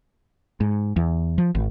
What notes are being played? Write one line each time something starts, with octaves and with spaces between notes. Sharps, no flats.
G#2
E2
F3
G#1